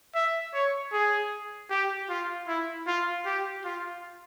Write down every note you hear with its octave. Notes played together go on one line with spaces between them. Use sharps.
E5
C#5
G#4
G4
F4
E4
F4
G4
F4